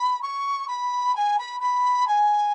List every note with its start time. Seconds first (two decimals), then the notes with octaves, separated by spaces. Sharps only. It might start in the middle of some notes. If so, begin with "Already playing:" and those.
Already playing: B5
0.22 C#6
0.68 B5
1.15 G#5
1.39 B5
1.61 B5
2.08 G#5